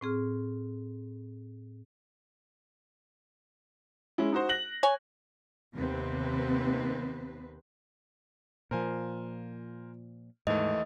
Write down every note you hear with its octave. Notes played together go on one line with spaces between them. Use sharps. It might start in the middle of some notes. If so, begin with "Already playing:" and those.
A2 C4 G#4 F6
G#3 C#4 E4
D#4 F#4 C5
F#6 A#6 F#7
C#5 G#5
D#2 C3 D#3 B3 C4 B4
A#2 F3 A#4 C5 G#5
D#2 G#2 E3 A3 D#5